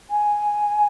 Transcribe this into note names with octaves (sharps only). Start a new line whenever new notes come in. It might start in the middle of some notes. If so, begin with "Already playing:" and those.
G#5